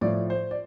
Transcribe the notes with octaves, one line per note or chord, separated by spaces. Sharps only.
A2 F3 D5
C5
D5